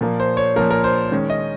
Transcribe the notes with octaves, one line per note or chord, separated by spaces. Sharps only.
A#2 F3 A#3
C5
C#5
A#2 F3 A#3 A#4
A#4
C5
D#3 G#3 C#4
D#5